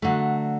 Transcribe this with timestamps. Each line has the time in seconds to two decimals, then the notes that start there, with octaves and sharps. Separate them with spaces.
0.02 D3 F#3 A3